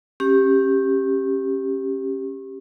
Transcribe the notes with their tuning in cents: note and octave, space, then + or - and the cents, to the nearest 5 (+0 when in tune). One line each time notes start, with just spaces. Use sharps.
C#4 -30 G4 +0